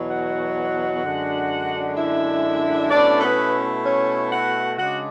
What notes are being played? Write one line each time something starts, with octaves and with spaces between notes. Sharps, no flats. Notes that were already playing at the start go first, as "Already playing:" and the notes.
Already playing: E2 B2 F#3
F#4 F#5
F#2 D3 G#3 D4
E4 E5
B2 A3 C#4 D4 E4 D5
A4
B3 B4
C#4 C#5
F#4 F#5
C#3 G#3 D4 F#4 F#5